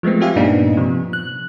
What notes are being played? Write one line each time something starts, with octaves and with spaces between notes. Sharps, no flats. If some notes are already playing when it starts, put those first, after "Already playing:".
F3 G#3 A3 B3 C4
C4 F4 G4 E5 F5 G#5
G2 A#2 A#3 B3 D4 D#4
C3 F3
F#6